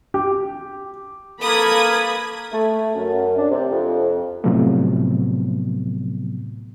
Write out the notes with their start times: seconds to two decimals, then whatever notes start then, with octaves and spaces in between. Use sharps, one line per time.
0.14 G4
1.41 A#3 A4 B4 B5 D#6 G#6
2.52 A3
2.94 F#2
3.37 D4
3.50 C3
3.71 F2
4.44 A2 C3 F3 F#3 A3 B3